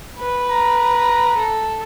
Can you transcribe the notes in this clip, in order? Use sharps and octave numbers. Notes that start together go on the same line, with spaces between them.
B4
A#5
A4